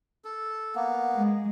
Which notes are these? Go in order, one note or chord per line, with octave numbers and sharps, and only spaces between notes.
A4
A#3 B3
G#3